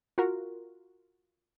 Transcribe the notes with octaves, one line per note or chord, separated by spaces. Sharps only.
F4 F#4 A#4